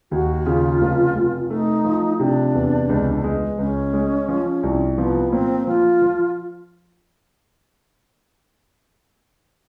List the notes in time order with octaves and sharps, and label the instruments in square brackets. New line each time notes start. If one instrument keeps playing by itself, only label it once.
[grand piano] D#2 [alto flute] F#4
[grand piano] C#3 [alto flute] F4
[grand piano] F1
F1
[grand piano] A3 [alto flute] D#4
[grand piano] F3
[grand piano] C3 [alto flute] D4
[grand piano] E2
C#2
G#3
[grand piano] C#2 [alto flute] C#4
[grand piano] G#3
F3
C2
[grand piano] F3 [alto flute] B3
[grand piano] A#2 [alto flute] C4
[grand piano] F3 [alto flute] F4
[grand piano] F3